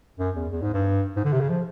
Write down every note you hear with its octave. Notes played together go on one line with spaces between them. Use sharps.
F#2
E2
E2
G#2
G2
G#2
D3
C3
C#3
F3